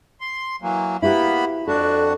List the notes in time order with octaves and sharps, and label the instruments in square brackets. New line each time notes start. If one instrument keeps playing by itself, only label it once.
[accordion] C6
E3 F#3 A#3
[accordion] A#3 B3 B5 [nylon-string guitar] E4 F#4 G4
[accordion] F2 D4 F#4 [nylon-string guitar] A4